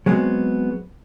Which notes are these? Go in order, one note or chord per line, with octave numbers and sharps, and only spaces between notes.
F#3 G#3 B3 C4